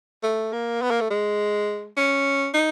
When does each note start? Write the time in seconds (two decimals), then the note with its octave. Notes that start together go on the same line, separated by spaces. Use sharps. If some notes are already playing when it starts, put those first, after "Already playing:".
0.23 A3
0.53 A#3
0.82 B3
0.91 A#3
1.01 A3
1.10 G#3
1.97 C#4
2.54 D#4